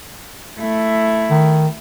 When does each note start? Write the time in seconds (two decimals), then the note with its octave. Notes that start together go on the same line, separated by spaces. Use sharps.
0.59 A3 E4
1.31 D#3